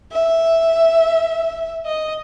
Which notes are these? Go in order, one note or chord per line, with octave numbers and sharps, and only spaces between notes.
E5
D#5